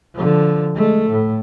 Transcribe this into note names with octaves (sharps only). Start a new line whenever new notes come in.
D3 F3
G#3 A3
A2